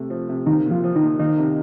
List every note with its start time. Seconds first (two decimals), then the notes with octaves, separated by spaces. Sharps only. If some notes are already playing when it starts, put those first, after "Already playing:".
Already playing: C3 A3
0.10 F3
0.29 C3
0.46 D#3 A#3 D#4
0.66 A#2
0.71 F3 F4
0.84 F3
0.96 D#3 D#4
1.02 A#2
1.19 D#3 A#3 D#4
1.38 C3